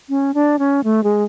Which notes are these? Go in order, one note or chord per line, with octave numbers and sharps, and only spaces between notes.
C#4
D4
C#4
A3
G#3